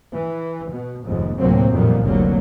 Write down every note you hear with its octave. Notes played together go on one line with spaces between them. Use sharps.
E3
B2
F1 D#2 G#2
D2 A2 C3 F#3 A#3 C4
F2 A#2 D#3 G3 A#3 B3
F1 C2 D3 F#3 G3 A#3